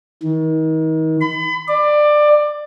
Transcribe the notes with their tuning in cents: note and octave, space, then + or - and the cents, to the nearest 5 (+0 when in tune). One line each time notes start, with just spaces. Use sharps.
D#3 +35
B5 +35
D5 +20